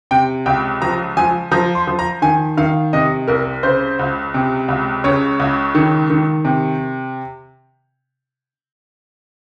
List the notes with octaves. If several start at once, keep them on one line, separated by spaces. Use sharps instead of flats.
C3 G5
C#2 G5
F3 A#5
F3 G#5
F3 A#5
C6
F3
A#5
D#3 G#5
D#3 F5
C3 D#5
C2 A#4
C#3 C5
C#2
C3
C#2
C#3 C#5
C#2
D#3
D#3
C3